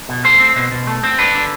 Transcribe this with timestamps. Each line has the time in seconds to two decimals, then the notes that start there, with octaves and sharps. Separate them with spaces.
0.09 B2
0.25 A3 C5
0.40 C4
0.56 B2
0.72 B2
0.87 A3
1.03 C4
1.18 D4 B4
1.35 D3